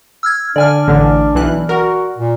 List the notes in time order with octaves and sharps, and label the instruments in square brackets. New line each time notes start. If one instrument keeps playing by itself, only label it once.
[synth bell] E6 F6 G#6
[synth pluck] D3 [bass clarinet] D4 [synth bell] D5 G#5 F6
[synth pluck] A1 D3
B1 E3 F#6
[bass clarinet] F#4 [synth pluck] A#4
[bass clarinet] A#2